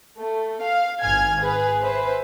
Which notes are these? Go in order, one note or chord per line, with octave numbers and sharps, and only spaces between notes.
A3
F5
G#1 G#5 F6 G#6
G#4 B4
B4 C5 E5